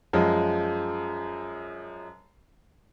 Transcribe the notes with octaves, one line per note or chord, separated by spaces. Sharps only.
F#2 F3 G#3